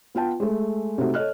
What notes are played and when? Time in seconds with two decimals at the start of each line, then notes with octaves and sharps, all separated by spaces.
0.15 B3 F4 G5 A5
0.40 G#3 A3
0.98 C3 A3 D#4 F#4
1.14 A4 C#5 D#5 F6 F#6